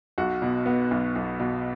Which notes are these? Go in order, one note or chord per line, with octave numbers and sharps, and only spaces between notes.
B1 F#4
B2
B3
B1
B1
B2